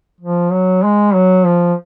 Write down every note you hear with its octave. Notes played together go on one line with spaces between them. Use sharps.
F3
F#3
G#3
F#3
F3